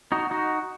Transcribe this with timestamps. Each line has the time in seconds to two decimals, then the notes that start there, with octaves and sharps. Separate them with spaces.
0.12 D#4 F#4
0.31 D#4 F#4